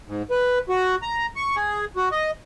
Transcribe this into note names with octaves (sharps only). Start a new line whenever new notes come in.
G#2
B4
F#4
A#5
C#6
G#4
F#4
D#5